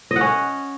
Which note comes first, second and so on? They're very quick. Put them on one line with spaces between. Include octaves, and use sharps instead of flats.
D#5 F#5 C#4